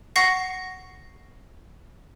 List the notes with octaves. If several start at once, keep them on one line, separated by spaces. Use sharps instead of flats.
F#5 C#6 A#6 C7